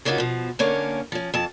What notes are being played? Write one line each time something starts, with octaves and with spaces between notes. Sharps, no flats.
C#3 A#3 C#4 D#4 F4 F#4
B2 F3
D3 A#3 C#4 C#5
F3 C#4
F2 A5